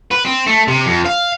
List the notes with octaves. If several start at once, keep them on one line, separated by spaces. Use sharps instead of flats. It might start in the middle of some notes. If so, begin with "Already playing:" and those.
B4
C4
A3
C3
F2
F5